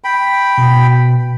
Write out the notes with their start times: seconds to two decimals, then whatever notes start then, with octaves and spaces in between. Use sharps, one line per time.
0.04 G5 B5
0.57 B2